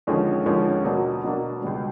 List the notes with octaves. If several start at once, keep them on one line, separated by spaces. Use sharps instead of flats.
D#2 D3 F3 G#3 C#4
D#2 D3 F3 G#3 C#4
B2 F#3 A#3 D4
B2 F#3 A#3 D4
C#2 B2 G3